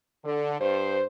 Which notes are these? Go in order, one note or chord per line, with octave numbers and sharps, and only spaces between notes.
D3
G2 C5